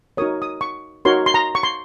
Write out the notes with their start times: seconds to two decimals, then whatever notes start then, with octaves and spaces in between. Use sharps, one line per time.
0.17 D#4 F#4 A#4 C#5 D#6
0.42 D#6
0.61 C#6
1.05 D#4 F#4 A#4 C#5 C6
1.26 C6
1.34 A#5
1.55 C#6
1.63 C6